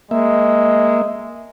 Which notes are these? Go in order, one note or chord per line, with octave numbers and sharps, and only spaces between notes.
G#3 A#3 E5